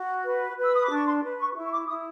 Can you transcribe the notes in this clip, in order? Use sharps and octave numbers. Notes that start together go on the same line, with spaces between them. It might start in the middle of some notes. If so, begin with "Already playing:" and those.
Already playing: F#4
B4
B4
E6
D#6
D6
D4
C#6
C6
B4
C#6
E4
C#6
D6
E4 D#6